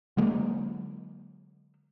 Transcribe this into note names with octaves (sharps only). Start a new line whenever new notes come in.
D3 F#3 G#3 A#3